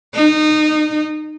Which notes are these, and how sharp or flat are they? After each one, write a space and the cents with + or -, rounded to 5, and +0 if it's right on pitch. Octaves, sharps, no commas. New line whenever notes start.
D#4 -25